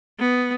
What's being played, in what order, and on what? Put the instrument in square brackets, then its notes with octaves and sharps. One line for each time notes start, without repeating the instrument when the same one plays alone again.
[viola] B3